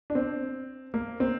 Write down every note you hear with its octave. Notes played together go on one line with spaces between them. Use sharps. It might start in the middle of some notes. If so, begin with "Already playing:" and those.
D4
C4
A#3
C4